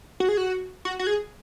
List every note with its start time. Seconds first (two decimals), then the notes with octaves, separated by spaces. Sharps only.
0.20 F#4
0.29 G#4
0.37 F#4
0.85 F#4
0.99 F#4
1.07 G#4